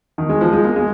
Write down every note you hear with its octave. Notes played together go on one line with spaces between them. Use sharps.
D#3
G#3
F3
G#3
A#3
G#3